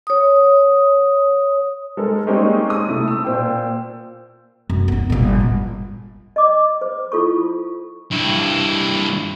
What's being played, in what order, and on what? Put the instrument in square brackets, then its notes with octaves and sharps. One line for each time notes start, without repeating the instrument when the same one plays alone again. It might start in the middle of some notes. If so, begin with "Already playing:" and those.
[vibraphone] C#5 D#6
[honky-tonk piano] G#3 A4 A#4
G3 G#3 A#3 C4 C#4 D#4
D#6
C3 A3 E4
E6
A#2 C5 G5
[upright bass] F#2
B3 D#4
G1 A#2
G#3
[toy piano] D#5 D6
C5
E4 F4 A4 C#6
[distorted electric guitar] G2 E4